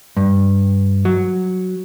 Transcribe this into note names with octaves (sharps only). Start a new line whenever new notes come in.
G2
F#3